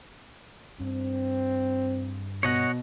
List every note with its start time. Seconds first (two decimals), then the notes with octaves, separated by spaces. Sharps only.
0.80 G2 C4
2.43 B2 C#5 D#5 F#5 A#6